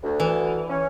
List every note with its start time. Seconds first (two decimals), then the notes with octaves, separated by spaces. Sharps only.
0.03 D2
0.20 E3
0.69 C#4